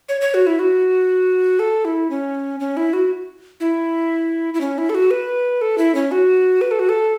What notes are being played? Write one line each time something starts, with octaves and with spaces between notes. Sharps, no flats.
C#5
C#5
F#4
E4
F#4
A4
E4
C#4
C#4
E4
F#4
E4
E4
C#4
E4
A4
F#4
B4
A4
E4
C#4
F#4
B4
A4
F#4
A4